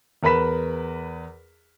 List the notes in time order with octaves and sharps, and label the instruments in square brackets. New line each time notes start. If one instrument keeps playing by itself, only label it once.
[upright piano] E2 A#4 B4 B5 B6 E7